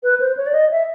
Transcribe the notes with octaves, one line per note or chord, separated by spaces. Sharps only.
B4
C5
C#5
D5
D#5
E5